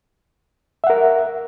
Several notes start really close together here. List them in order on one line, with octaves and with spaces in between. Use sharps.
E5 F#5 A#4